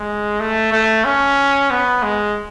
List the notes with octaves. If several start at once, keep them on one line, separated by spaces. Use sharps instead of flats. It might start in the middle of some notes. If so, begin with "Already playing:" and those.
Already playing: G#3
A3
A3
C#4
B3
G#3